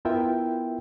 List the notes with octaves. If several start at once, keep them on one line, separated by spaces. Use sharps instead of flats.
B3 E4 F4 A#4 E5 G5